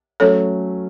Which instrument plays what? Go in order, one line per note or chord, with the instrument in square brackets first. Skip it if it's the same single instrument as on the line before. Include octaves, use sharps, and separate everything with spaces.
[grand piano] F#3 A3 C#4 [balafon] A4 C#5